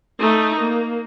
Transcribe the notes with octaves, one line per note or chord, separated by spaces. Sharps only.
A3 D#4
A#3